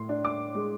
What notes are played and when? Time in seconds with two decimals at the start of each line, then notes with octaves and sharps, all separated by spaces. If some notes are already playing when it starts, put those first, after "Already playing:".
Already playing: A2 C6
0.09 D4
0.25 D6
0.55 G#3